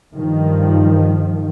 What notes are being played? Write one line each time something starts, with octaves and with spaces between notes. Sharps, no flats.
G2 D#3 F3